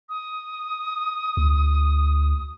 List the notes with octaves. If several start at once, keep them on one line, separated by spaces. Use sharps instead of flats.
D#6
D2